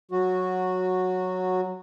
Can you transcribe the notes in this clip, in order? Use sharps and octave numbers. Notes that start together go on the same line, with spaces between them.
F#3 F#4